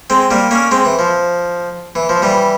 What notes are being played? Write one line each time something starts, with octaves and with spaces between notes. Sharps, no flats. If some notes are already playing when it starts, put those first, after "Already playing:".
G#3 C4
G3 A#3
A#3 C#4
G#3 C4
E3
F3
E3
F3
E3 G3